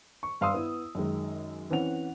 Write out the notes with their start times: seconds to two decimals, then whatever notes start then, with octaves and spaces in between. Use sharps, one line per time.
0.23 C#6
0.41 G2 F5 C6 D#6 E6
0.54 B3 E4
0.95 F#2 D#3 G#3
1.70 E3 C4 C#4 F#5 F7